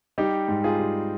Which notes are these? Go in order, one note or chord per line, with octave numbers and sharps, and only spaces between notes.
G3 D#4 G4
G#2
F4 G#4
G3